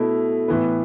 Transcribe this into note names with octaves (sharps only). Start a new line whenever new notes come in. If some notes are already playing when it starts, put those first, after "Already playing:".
Already playing: B2 A3 E4
A2 E3 B3